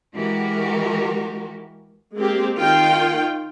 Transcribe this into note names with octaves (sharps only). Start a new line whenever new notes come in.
E3 G#3 F#4 G4 A#4
G#3 A#3 C4 G4
D#3 F4 G5